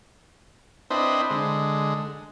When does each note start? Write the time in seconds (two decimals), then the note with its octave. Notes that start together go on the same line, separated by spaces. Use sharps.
0.90 C4 D4 E4 B4 C5 D#5
1.31 D3 G#3